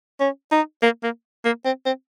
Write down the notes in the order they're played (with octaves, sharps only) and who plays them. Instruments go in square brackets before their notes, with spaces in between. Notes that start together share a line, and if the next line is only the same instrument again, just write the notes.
[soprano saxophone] C#4
D#4
A#3
A#3
A#3
C4
C4